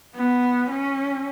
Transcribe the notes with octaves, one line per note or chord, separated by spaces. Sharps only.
B3
C#4